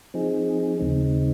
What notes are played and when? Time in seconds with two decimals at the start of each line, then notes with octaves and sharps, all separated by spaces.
0.14 F3 C4 D#4 G#4
0.79 D#2 C#3 G#3 C4 D#4